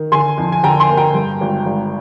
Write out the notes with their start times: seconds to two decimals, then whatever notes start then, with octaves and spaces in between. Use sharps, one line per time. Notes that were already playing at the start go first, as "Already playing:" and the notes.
Already playing: D#3
0.12 D3 G#5 C6
0.38 F2
0.52 G#5
0.64 D3 G5 A#5
0.80 G#5 C6
0.89 A#3
0.97 G5 A#5
1.14 G2
1.41 G#1
1.66 G#1